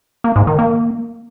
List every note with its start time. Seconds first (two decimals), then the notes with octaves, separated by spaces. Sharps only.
0.24 A#3
0.36 G#2
0.47 D#3
0.59 A#3